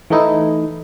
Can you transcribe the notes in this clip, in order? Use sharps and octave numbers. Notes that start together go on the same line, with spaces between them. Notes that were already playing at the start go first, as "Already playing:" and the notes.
E3 A3 D#4 E4